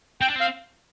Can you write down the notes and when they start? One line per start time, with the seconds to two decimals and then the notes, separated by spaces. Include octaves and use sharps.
0.21 C4 G5
0.30 D4
0.36 C4 F5